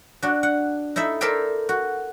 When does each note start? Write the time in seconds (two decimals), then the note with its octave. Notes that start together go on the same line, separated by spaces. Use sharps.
0.23 D4 F#4
0.43 F#5
0.96 D#4 E4 A4 E5
1.21 A4 A#4 C5 D5 E5 G5
1.69 F#4